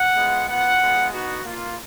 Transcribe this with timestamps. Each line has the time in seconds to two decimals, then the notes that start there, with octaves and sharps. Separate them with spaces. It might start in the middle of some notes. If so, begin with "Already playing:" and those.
Already playing: F#5
0.17 G#3 B3 F4
0.49 B3 F4 F#5
0.81 G#3 B3 F4
1.12 B3 D#4 F#4
1.44 A#3 F4